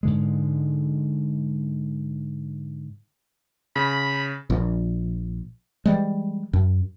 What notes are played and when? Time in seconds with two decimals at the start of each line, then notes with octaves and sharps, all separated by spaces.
0.03 G#2 D3 G#3
3.76 C#3 B5
4.50 A#1
5.86 E3 G3 G#3
6.53 F#2